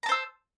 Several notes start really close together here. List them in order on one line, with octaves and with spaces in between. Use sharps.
A#5 A5 C5 E6